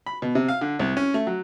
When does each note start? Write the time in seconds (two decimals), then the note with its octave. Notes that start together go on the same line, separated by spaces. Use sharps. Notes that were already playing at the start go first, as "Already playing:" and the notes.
0.06 B5
0.22 B2
0.35 C3
0.48 F5
0.61 D3
0.79 C2
0.97 C#4
1.14 A3
1.27 F#3